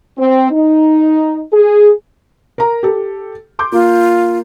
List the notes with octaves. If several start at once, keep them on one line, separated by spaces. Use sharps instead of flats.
C4
D#4
G#4
A#4 A#5
G4 A4
C6 D6 G6
A#3 F4